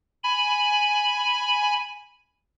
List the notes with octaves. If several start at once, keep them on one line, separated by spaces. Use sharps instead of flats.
G#5 B5